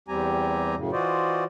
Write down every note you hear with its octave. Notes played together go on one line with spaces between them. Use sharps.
E2 G3 C4 G4 G#5 A#5
F#2 A2 C#3
E3 F4 F#4 C5 D5 D#5